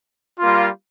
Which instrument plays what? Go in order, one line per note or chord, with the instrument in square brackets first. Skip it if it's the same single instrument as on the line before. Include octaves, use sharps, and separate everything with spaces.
[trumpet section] G3 A#3 F4